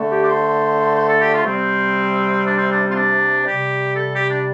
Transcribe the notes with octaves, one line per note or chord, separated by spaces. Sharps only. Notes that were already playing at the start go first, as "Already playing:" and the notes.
Already playing: D3 A3
G4
D5
C5
C5
A4
G4
F4
C3 G3 C4
D4
C4
D4
C4
F4
D4
C3 G3 G4
A4
G4
D4